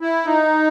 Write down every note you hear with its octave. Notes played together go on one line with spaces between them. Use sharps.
E4
D#4